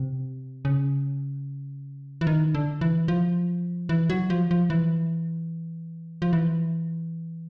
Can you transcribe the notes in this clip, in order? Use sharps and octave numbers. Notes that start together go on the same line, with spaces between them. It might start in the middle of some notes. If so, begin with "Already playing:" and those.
Already playing: C3
C#3
E3
D#3
D3
E3
F3
E3
F#3
F3
F3
E3
F3
E3